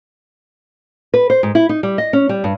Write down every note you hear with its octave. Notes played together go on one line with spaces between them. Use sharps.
B4
C5
G#2
E4
D#4
G3
D#5
C#4
G3
G2